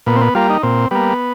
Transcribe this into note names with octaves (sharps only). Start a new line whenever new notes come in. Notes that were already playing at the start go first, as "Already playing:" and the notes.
A#2 B3
C4
B3
G3 A#3 F4
D#4
A#2 C4
G3 A#3 B3